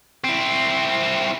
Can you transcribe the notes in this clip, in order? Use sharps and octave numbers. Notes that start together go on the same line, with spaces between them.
C4 E4